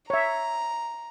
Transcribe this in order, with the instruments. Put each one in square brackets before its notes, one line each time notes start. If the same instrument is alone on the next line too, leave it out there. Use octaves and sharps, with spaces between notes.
[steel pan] C#5 E5 [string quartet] A#5